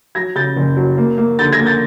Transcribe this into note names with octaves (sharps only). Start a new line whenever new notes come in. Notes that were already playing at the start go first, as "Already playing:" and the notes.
F#3 G#6 A#6
C#3 G6 A6
F#1
F#3
A#3
A#3
D3 G6 A6
G#6 A#6
A#3
G6 A6